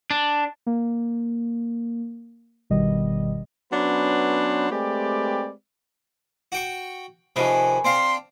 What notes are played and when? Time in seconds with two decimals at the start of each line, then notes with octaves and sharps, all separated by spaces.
0.11 D4
0.67 A#3
2.70 G1 B2 D#3 G3 D#5
3.71 F#3 B3 C#4 D4 B4 C5
4.70 G#3 A3 C4 G4 B4 D5
6.52 F#4 G5 C#6
7.36 C3 D#3 F3 C#4 G#4 B4
7.84 C4 D4 F5 C6